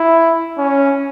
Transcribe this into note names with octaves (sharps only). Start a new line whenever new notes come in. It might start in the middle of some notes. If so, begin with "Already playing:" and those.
Already playing: E4
C#4